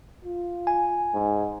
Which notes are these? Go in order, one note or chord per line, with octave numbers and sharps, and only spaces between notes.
F4
G#5
G#2